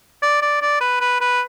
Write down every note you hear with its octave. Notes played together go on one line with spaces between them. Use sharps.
D5
D5
D5
B4
B4
B4